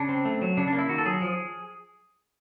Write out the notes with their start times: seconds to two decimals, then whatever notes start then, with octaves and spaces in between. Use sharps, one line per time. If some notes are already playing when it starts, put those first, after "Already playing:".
Already playing: C#3 D4
0.09 C4
0.25 A3
0.42 F#3
0.57 C#3 D4
0.68 D4
0.73 A#3
0.79 E4
0.89 D#3 F#4
0.98 A4
1.05 F#3 G#4
1.22 F3